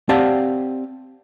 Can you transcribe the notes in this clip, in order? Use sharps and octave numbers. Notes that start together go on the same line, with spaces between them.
C4 G4 D5 F5 F#5 A5